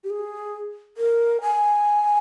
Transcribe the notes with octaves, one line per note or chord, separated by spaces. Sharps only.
G4
G#4
A#4
G#5